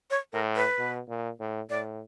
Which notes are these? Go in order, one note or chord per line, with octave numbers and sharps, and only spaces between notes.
C#5
A2 A#4
B4
B2
A#2
A2
A2 D5